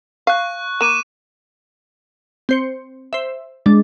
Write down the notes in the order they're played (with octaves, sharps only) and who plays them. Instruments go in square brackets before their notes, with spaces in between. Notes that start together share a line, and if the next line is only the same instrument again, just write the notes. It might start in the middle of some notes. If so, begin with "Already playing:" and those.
[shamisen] F5 [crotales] C#6 F#6
[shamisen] A#3 [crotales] D6 D#7 E7
[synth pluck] C4 C5 C#7
C5 E5
[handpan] G#3 [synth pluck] D4